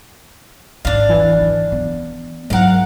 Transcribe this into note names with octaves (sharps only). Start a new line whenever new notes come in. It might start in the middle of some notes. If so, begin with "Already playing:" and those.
G#1 E2 D4 F5
E3
D#2 D3
B3
G#2 F#3 E4 A#4 F5 F#5